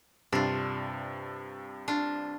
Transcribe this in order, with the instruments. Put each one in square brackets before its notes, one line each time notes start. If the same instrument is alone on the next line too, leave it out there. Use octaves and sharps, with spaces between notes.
[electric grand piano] G2 C3 [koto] D4 F4
[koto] D4 F4